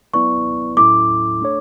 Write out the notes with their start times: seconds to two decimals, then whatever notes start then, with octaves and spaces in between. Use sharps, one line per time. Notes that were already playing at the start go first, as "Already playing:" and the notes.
0.14 F#3 B3 E4 B4 D5 C#6
0.77 A2 F#3 C#4 E4 A4 D6
1.41 A3 D4 A4 C#5